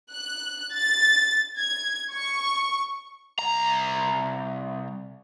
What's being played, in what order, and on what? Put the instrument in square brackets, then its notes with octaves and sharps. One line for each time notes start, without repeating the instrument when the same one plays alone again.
[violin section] F#6
A6
G#6
C#6
[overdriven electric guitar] C2 A#5